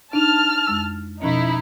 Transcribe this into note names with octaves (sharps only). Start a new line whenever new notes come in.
D4 D#4 A5 F6
F2 G#3 E6
B2 F3 C#4 D#4 E4